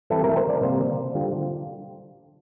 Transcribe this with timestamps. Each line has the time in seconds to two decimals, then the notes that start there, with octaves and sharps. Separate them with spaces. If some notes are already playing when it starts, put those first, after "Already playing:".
0.10 E3 G3 C4 E4 A4
0.24 A#4
0.37 C5
0.49 D5
0.62 C3 G3 A#3 C5
1.15 D3 G3 D4 F4